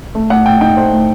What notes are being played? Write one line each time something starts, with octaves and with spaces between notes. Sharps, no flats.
A3
A2 F#5
A2 G5
D#4 G5
A3 C5
A2